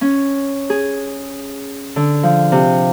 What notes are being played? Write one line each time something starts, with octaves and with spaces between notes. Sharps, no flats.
C#4
G#4
D3
F3
C3